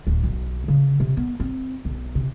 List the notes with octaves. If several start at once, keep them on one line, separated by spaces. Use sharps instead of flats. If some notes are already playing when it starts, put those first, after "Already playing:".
D1
B1
C#3
C3
B3
C4
B1
C3